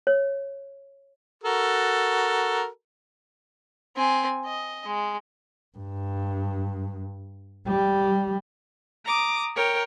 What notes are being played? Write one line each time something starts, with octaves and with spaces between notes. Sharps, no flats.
C#5
F#4 A4 A#4
C4 G#5
D#5
G#3
G2
G3
A#5 D6 D#6
A#4 C#5 G5